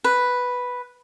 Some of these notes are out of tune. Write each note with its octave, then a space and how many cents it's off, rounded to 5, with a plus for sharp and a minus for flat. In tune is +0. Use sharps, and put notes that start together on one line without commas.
B4 +0